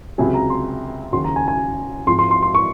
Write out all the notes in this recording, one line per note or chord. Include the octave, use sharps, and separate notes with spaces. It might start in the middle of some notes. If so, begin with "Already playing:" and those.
C#2 C3 F#3 G#5
A#5
C6
D#2 C#3 F#3 C#4 F#4 C6
A#5
G#5
G#5
G#2 F3 C4 F4 C6
C6
C6
C6
C#6